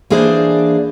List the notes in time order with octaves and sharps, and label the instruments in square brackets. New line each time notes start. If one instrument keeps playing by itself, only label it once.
[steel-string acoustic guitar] E3 A#3 D4 G#4 C5 D5